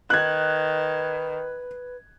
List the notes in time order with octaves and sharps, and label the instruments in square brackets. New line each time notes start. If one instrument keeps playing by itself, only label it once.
[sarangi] D#3 [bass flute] B4 [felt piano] F#6 G#6